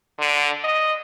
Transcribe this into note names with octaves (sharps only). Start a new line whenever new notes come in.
D3
D#5